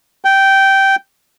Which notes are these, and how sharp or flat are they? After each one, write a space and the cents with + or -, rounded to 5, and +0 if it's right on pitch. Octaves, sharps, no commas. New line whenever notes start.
G5 -10